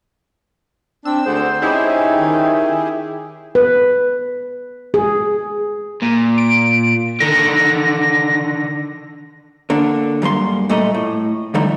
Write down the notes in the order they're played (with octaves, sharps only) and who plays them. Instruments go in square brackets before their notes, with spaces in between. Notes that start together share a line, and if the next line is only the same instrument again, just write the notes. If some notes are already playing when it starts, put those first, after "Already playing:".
[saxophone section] C4 [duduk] D4 [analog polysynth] E6
[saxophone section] D2 G#4 F#5 [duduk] C5
[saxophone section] C#4 D#4 [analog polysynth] E4 G4 G#4
[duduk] D#3
[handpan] B4
G#4
[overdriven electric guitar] A#2
[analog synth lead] D7
[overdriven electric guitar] D3 D#3 [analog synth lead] A#6
[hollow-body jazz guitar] D3 A#3 D4
F#2 G3 A#3 C6
A#2 G3 A3 D#5
A2
D3 F3 G3 A3 D#4